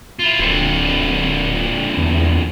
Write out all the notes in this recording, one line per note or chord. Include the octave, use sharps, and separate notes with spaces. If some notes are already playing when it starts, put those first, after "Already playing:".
E4 F4
D1 F2 D3
E2